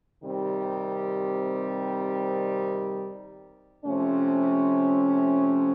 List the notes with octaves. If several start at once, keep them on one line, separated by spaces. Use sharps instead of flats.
C3 D#3 G3 C4
C3 F3 A3 C#4